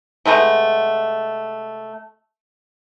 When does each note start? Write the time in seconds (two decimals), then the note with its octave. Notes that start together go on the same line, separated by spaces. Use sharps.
0.25 C3 G#3 A3 B3